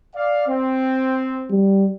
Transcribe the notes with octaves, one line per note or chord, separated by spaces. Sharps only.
D5 F5
C4
G3